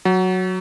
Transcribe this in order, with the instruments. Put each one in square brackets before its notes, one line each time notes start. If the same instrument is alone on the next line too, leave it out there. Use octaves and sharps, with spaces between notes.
[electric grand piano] F#3